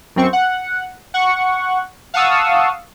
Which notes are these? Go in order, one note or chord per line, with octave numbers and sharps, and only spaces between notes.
F#2 C4 C#6
F#5
F#5 C#6
F5 F#5 A5 C#6 D#6 E6